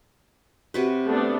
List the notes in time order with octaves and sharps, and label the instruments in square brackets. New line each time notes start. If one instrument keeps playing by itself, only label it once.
[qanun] C3 F#4 B4
[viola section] A3 B3 D4